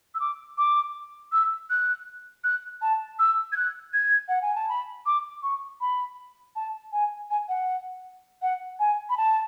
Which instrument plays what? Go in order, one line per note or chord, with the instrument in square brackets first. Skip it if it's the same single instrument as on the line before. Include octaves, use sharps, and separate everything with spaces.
[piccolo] E6
D6
D6
E6
F#6
F#6
A5
E6
G#6
F#6
G#6
F#5
G#5
A5
B5
D6
C#6
B5
A5
G#5
G#5
F#5
F#5
G#5
B5
A5